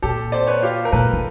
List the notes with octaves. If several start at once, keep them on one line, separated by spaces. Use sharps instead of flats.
A#2 G4 A4
C5 D5
B4 C#5
F4 G4
A#4
A#2 A4 B4
D3